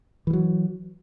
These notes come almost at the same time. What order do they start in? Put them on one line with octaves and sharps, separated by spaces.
E3 G3 F#3